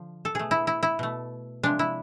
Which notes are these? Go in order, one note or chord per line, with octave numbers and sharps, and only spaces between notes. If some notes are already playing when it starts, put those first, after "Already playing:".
Already playing: D3 F3
A4
B2 A3 G#4
E4
E4
E4
B2 A3
C3 F3 G#3 D4
E4